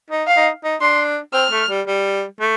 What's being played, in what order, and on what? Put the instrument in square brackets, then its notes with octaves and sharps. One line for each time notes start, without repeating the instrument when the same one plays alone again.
[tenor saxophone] D#4
[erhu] F5
[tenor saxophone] D#4
D#4
[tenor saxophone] D4 [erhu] C6
[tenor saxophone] C4 [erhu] F6
[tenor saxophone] A3
G3
G3
A3